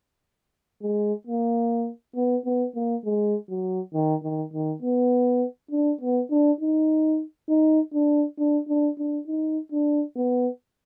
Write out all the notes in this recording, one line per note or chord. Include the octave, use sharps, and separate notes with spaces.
G#3
A#3
B3
B3
A#3
G#3
F#3
D#3
D#3
D#3
B3
D4
B3
D4
D#4
D#4
D4
D4
D4
D4
D#4
D4
B3